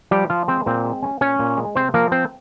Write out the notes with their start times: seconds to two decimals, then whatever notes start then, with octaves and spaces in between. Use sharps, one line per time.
0.11 F3 G3 G4
0.30 F3 F4
0.48 G#3 C4 C5
0.66 A#2 C4 C5
0.85 G#3
1.02 C#4
1.21 A#2 C#4 C#5
1.39 A#2
1.57 G#3
1.75 C3 C4 C5
1.94 F3 A#3 A#4
2.12 C4 C5